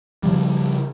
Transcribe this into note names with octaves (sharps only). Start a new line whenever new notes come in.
C#3 F3 G3